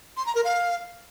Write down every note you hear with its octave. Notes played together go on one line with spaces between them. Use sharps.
C6
A#5
A#4
F5